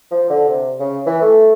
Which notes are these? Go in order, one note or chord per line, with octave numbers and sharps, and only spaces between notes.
F3
D3
C3
C#3
E3
A3